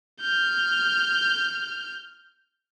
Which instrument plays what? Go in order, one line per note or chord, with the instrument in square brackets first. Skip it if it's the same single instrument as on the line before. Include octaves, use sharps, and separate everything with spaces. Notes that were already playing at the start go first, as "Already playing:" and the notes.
[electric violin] F6 G6